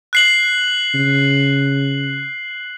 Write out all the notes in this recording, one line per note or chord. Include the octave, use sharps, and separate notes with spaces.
F#6 C7 F#7
C#3